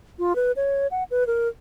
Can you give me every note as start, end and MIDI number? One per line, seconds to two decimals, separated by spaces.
0.19 0.36 65
0.36 0.52 71
0.56 0.87 73
0.91 1.04 78
1.11 1.26 71
1.27 1.48 70